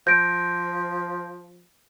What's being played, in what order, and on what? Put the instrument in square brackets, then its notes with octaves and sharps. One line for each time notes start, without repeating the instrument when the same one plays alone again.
[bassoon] F3 [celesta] G6 A#6 D7